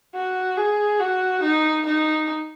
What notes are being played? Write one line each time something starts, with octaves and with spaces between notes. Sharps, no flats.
F#4
G#4
F#4
D#4
D#4